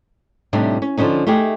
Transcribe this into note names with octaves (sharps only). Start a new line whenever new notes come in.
A2 C3 G3 D4 D#4
C#4
D3 F3 F#3 C#4 D#4
A3 D#4 G4 G#4